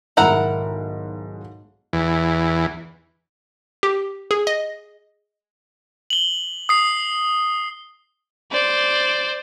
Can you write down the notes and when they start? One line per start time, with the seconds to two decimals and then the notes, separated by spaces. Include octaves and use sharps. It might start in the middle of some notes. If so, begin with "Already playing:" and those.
0.17 B1 G#2 D#3 E4 A#4 F#5
1.93 E2
3.83 G4
4.31 G#4
4.47 D#5
6.10 F#7 G7
6.69 D#6 C7
8.52 C5 D5